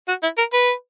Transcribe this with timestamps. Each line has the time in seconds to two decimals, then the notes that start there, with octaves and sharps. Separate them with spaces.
0.08 F#4
0.23 E4
0.38 A#4
0.53 B4